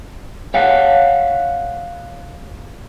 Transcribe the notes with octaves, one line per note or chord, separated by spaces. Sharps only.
C#5 F5 F#5